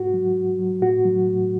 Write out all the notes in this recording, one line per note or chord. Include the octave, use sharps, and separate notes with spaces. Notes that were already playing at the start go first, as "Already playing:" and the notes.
Already playing: G#2 F#4
F#3
G#2
F#3
A2 F#4
F#3
A2